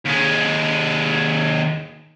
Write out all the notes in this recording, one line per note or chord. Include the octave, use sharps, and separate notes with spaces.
D#2 G#3